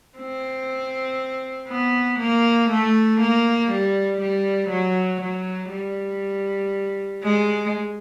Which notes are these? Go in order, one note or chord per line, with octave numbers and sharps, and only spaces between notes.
C4
B3
A#3
A3
A#3
G3
G3
F#3
F#3
G3
G#3